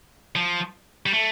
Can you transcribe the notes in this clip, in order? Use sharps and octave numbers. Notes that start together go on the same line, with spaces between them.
F3
G3
A3